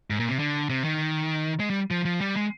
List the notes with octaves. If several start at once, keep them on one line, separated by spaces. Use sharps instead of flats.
G#2
A#2
C3
D3
C3
D#3
G#3
G3
F3
F3
G3
G#3